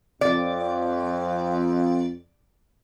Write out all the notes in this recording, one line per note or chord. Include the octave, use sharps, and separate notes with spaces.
F2 D5